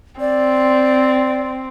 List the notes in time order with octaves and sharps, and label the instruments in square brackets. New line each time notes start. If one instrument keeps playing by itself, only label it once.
[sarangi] C4 [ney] D5